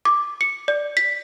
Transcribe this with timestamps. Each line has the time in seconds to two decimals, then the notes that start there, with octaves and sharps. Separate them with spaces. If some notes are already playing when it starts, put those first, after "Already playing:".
0.05 D6
0.41 C#7
0.68 D5
0.97 B6